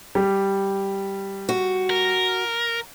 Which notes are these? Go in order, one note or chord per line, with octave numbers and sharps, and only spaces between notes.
G3
F#4
A#4